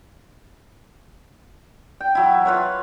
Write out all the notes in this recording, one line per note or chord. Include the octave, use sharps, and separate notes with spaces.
G5
F#3 E4
F4 B4 C#5